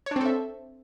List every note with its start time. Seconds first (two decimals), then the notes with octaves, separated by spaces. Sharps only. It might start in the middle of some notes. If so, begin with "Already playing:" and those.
0.06 C#5
0.11 D4
0.16 C4
0.21 A4
0.26 E5